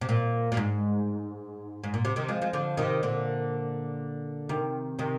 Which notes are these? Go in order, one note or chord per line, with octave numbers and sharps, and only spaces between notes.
C3
A#2
A#2
G#2
G#2
A#2
C3
C3 D#3
F3 G#3
F3 G#3
D3 F3
C3 D#3
A#2 D3
C3 D#3
C3 D#3